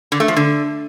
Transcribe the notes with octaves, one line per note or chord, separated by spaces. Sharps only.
D3
A3
F3
D3